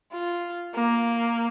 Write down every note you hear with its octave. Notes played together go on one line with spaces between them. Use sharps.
F4
A#3